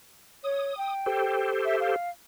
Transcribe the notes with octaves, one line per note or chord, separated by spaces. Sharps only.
C#5 D#6
G5
G4 A4 C5
E5
F5